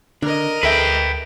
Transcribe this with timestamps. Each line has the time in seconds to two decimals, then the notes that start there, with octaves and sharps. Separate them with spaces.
0.22 D3 D4 A#4 D#5
0.63 D2 A4 B4 E5 G5